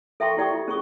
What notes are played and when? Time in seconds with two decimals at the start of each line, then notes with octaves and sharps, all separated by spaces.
0.20 A4 E5 G5 A5 C6 C#6
0.37 E4 G4 D5 G5 C#6 D#6
0.50 F4
0.68 C#4 G#4 C#6 D#6